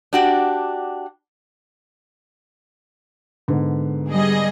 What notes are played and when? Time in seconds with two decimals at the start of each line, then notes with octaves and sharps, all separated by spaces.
0.13 D4 F#4 G4
3.48 G#2 D3 B3
4.09 G3 G#4 D#5